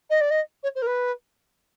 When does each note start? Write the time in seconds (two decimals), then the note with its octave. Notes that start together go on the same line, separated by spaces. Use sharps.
0.10 D#5
0.21 D5
0.30 D#5
0.63 C#5
0.75 C5
0.82 A#4
0.87 B4